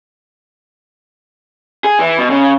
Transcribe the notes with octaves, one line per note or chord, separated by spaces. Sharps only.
G#4
E3
B2
C#3